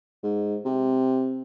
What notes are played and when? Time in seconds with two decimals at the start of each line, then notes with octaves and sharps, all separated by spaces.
0.23 G#2
0.65 C3